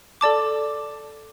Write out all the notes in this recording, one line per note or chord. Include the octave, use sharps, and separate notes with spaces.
A4 D5 A5 D6